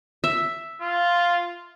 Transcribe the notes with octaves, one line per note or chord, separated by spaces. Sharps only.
E5
F4